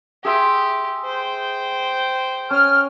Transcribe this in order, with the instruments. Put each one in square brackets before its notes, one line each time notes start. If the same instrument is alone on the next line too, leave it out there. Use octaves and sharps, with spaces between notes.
[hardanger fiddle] G4 [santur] G#4 E5 C6
[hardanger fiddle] C5 G5
[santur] C#4 [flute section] F6